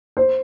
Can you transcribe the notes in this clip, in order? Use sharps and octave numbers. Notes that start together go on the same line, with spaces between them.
C5